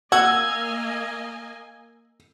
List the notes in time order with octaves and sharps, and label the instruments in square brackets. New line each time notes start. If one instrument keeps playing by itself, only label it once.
[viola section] A#3 D#5 G#5 [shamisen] F#4 [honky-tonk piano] E6 [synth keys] G#6